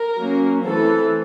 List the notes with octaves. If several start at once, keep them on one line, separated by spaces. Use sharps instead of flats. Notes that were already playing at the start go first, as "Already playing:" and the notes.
Already playing: A#4
F#3 A#3 C#4
E3 A3 C4 A4